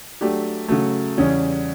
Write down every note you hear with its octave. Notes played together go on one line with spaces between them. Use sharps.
F#3 A3 D4 G4
C#3 F#3 A3
E2 C#3 G3 C#4